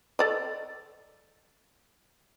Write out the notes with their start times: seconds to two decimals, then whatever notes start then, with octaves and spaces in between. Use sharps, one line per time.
0.19 A4 D5 D#5